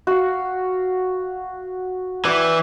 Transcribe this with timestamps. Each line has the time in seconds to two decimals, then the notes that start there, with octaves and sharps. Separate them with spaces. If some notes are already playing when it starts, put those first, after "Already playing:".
0.07 F#4 F5
2.25 E3 D5 G5